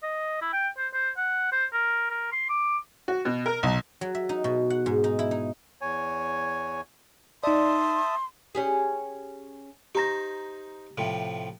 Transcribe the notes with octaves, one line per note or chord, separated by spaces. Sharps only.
D#5
E4
G5
C5
C5
F#5
C5
A#4
A#4
C6
D6
F#4
B2
A#4
B1
F#3
E5
D#4
B2
F#5
G#2
D#4
E4
D#4
E2 C#5 G#5
D#4 D5 E5 A5 C6 D#6
C#4 G4 G#4
D#4 G4 C5 A#5 A#6
A2 C3 F3